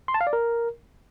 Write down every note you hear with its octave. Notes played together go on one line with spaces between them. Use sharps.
C6
A5
F5
D5
A#4